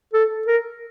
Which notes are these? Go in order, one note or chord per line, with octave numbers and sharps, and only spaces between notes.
A4
A#4